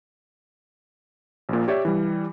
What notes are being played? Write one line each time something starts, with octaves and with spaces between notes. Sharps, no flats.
A#1 A#2
G4 C#5 D5 E5
E3 G3